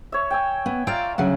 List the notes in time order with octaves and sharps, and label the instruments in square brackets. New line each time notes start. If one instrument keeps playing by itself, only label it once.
[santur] C#5 E5
G5 G#5 E6
[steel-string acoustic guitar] B3
[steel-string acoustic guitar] F4 D5 G5 [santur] E5 F5 A#5
[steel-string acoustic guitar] D2 C#3 F#3 [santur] F#5